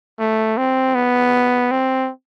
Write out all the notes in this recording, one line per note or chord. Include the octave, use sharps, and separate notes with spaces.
A3
C4
B3
C4